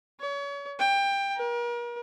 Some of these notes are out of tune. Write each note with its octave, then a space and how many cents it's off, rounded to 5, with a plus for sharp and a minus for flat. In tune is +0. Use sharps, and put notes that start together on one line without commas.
C#5 +35
G5 +20
A#4 +40